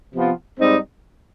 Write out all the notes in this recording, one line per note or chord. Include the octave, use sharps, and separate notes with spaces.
C3 F3 B3 F4
G#2 G3 C4 D#4